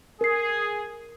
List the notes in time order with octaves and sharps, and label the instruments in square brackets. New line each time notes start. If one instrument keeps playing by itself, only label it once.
[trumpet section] G#4 [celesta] A#4 C7